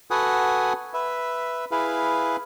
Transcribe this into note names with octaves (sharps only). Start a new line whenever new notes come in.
F#4 A4 B4 F#5 G#5 D#6
B4 E5
E4 G#4 B4 F5